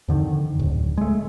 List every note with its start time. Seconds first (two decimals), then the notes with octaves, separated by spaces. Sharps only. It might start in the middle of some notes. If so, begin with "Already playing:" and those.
0.08 F2 D3 D#3
0.59 D1
0.98 G#3 A3